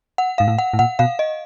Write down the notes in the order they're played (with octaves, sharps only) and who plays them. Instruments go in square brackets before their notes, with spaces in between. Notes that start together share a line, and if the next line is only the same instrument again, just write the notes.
[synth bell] F#5
[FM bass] G#2 [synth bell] F5
[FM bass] A2
[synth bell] F#5
[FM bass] A2
[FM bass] A#2 [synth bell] F#5
[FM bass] B2 [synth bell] F5
[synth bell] D#5